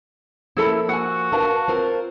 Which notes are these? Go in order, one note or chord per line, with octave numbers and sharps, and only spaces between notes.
F3 A#3 C#4 E4 A4 B5
F#4 F#5 G#5 E6
A#4 B4 F5 A5
C4 F4 A#4